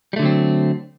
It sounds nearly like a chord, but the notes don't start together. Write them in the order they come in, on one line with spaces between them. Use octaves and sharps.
G3 A3 D3 F#3 C4